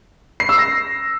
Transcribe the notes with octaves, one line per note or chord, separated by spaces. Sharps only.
C7
E6
A#6